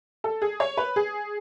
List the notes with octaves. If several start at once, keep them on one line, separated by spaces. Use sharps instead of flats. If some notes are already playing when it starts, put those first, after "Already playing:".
A4
G#4
C#5
B4
G#4